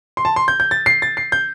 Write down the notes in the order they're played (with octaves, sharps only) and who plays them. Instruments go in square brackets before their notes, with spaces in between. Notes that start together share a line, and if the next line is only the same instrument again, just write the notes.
[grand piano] C6
A5
C6
G6
G6
A6
C7
A6
C7
G6